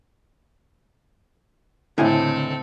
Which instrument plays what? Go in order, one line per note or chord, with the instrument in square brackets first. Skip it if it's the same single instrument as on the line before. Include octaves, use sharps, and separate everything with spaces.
[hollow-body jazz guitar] C#2 D3 [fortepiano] A2 G#5 [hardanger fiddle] C4 A4